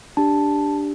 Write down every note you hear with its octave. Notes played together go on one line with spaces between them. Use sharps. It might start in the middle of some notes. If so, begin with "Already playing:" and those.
D4 G4 A5